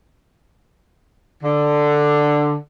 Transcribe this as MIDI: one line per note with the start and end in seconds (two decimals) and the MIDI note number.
1.43 2.55 50